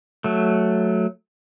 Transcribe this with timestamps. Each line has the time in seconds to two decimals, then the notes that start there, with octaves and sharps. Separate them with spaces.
0.24 F#3 A3